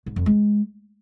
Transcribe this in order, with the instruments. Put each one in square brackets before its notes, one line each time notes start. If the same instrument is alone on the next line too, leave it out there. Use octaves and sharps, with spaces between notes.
[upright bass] G#2
F2
G#3